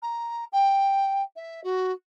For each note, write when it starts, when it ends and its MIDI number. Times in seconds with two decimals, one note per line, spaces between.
0.03 0.45 82
0.53 1.23 79
1.36 1.61 76
1.64 1.92 66